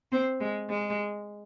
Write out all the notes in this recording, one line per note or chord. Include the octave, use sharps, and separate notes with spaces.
C4
G#3
G#3